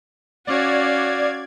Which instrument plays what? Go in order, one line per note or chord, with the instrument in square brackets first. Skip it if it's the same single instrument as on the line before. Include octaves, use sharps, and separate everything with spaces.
[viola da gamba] C#4 [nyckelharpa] F#4 F5 [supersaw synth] D5 G#6